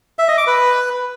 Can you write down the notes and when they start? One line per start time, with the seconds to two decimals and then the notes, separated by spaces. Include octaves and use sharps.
0.19 E5
0.28 D#5
0.38 D6
0.47 B4